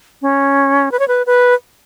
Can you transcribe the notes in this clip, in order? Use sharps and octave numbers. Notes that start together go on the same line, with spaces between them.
C#4
B4
C#5
B4
B4